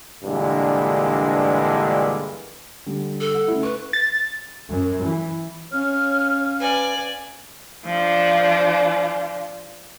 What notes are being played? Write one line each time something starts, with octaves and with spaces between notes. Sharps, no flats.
G2 A#2 D3 E3 G#3
D3 G3
A4
F#5
C#3 A3 E4
B4 C#6
A6
F#2
E3
C#4 C#5 F5 F6
B4 D5 G#5
F3 D4